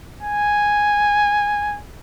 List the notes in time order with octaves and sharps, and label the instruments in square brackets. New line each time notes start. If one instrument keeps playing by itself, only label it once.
[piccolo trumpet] G#5